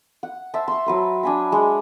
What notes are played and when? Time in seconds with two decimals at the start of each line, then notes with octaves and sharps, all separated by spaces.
0.23 F#5
0.54 C5 E5 A5
0.68 C6 C#6
0.86 F#3 B4 C5
1.23 D4 G#5 B5
1.52 G#3